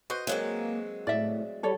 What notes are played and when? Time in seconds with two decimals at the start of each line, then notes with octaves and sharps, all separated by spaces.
0.10 F#4 B4 C5 D#5
0.27 F#3 G#3 A#3 C4
1.07 A2 D5 E5
1.63 G3 A4 C#5